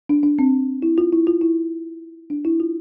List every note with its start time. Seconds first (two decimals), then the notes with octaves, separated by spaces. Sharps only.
0.09 D4
0.23 D4
0.39 C4
0.82 E4
0.98 F4
1.13 E4
1.27 F4
1.41 E4
2.30 D4
2.45 E4
2.60 F4